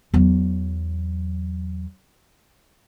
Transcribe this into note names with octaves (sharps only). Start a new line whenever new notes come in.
E2 F#3